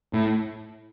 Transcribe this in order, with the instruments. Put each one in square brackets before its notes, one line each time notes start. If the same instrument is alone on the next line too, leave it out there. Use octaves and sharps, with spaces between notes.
[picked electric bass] A2